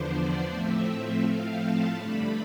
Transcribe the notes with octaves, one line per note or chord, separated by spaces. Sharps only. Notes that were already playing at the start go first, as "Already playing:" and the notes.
Already playing: E2 D3 F3 B3 D4 C5
D5
A2 F3 A3 C4 E5
A2 F3 A3 C4 F5
A5
G2 D3 A3 D4 B5